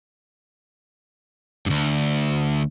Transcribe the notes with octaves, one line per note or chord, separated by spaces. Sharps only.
D2 G2